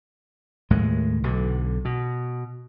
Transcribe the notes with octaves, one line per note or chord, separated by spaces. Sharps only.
D#2 A2 G#3
B1 D3
B2